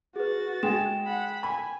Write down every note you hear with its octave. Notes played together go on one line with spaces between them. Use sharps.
F#4 G#4 B4 A6
G#3 G5 E7
F#5 B5
G#5 B5